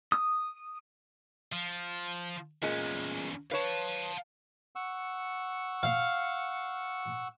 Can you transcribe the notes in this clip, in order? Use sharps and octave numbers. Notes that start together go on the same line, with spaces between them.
D#6
F3
E2 A#2 G#3 C#4
B4 C#5 F5 A5
F#5 C#6 E6
F5